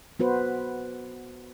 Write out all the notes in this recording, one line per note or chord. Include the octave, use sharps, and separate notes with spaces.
B3 F#4 B4 C5